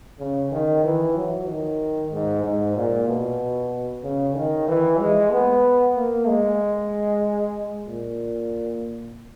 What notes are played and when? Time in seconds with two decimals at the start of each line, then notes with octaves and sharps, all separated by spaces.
0.19 C#3
0.52 D#3
0.84 E3
1.16 F#3
1.47 D#3
2.12 G#2
2.44 G#2
2.76 A#2
3.08 B2
4.03 C#3
4.35 D#3
4.68 E3
4.99 G#3
5.32 B3
5.96 A#3
6.28 G#3
7.87 A#2